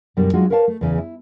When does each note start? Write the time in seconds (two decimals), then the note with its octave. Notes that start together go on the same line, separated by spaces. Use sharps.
0.17 F#2 B2 D3 G3 D4
0.34 F#3 G#3 D4 D#4 F4 F#4
0.50 A#4 B4 C#5 F5 G5 A5
0.68 A3
0.81 E2 C#3 E3
0.98 E4